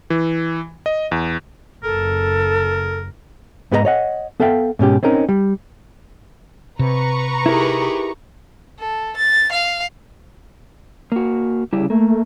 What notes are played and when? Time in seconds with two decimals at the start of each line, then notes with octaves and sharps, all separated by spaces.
0.10 E3
0.86 D#5
1.12 E2
1.84 F#1 C#3 A4 A#4
3.71 G#2 B3 F#4 G4 D#5 A#5
3.85 C#5 D#5 F#5
4.40 B3 A4 E5 F5 G5
4.79 G#2 B2 C#4 G4
5.03 C4 C#4 D#4 A#4
5.29 G3
6.79 C3 B4 A#5 C#6
7.46 D#4 E4 G4 G#4 A#4
8.79 A4
9.17 A6
9.52 F5
11.12 A#3 F#4
11.73 C#3 G3 E4 G4
11.90 A3 A#3